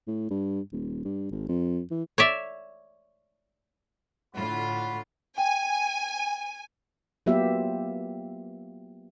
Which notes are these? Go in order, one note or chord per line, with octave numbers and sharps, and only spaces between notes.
A2
G2
D#1
G2
G#1
F2
E3
C#5 D5 E5
A2 D3 F4 F#4 F#5 B5
G5 G#5
F#3 A#3 B3 F4 G4 E5